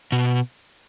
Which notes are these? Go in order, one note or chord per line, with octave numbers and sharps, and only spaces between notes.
B2